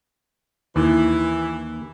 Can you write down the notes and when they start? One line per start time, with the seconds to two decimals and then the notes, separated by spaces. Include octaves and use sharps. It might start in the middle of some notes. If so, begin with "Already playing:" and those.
0.76 D#2 E3